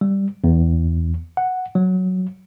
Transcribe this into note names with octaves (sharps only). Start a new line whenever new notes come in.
G3
E2
F#5
F#3